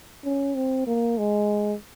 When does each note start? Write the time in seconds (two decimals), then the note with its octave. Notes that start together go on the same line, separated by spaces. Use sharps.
0.24 C#4
0.55 C4
0.87 A#3
1.18 G#3